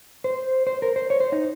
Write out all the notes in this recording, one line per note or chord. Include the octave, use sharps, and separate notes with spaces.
C5
C5
A#4
C5
C#5
C5
D#4